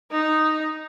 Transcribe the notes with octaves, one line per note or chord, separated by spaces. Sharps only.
D#4